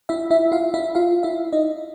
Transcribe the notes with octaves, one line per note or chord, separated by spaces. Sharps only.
E4 E5
E4 E5
F4 F5
E4 E5
F4 F5
E4 E5
D#4 D#5